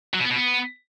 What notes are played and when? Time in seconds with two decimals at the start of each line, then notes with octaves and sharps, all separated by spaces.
0.14 F#3
0.19 B2
0.25 B3
0.30 B2
0.36 B3